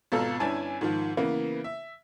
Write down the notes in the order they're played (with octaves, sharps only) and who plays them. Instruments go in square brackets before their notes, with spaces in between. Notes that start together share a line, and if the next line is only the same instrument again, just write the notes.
[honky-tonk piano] G#1 B2 F4 A4 A#5 E6
G1 C#4 D4 E4 G#5 A5
G#2 D#3 F3
C#3 E3 A#3 B3
E5